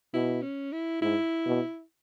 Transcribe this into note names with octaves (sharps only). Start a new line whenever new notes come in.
B2 E4
C#4
E4
G#2 E4
B2